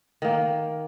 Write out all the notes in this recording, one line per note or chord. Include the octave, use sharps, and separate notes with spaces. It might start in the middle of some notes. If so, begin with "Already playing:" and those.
D#3 A#3